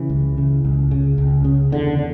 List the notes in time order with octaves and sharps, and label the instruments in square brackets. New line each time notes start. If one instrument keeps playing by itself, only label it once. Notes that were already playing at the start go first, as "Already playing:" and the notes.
Already playing: [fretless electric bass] C#3 E3
C#2
C#3
C#2
C#3
C#2
C#3
E2 D3
D3